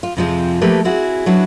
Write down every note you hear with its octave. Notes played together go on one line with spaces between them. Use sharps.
F4
F2 C3 F3 G#3 C4 F4
F3 A3 A#3 G4 B4
C4 E4 F#4 G#4
F#3 D4 E4 F#4 B4